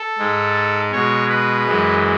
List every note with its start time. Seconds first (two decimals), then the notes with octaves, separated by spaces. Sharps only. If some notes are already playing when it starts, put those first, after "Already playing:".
Already playing: A4
0.18 G#2 G#3
0.92 B2 G#3 C#5
1.29 B4
1.66 F#2 E3 G#3